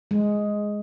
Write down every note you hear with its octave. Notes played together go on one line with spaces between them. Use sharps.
G#3